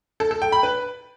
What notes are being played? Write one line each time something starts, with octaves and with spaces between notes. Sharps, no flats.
A4
A4
G5
B5
B4